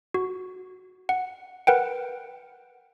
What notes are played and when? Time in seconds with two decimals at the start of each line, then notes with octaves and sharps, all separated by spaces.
0.14 F#4
1.09 F#5
1.67 A#4 B4 F#5 G5